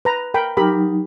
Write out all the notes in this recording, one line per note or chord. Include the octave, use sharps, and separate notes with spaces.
B4 A#5
A#4 G5 B5
F#3 D#4 G4 A#4 B5